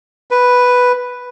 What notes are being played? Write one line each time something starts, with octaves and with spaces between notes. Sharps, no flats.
B4